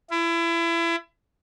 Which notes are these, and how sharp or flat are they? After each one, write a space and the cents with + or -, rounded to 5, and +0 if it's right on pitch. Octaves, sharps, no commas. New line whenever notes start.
E4 +30